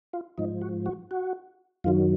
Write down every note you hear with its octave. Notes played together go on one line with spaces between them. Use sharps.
F4
G#2 F3 D#4
F#4
F#4
F#4
F#2 D#3 F#3 F4